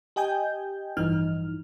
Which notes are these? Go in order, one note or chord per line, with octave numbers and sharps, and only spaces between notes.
G4 D#5 G5 G#5 G6
A1 G2 E3 F3 D#4 F6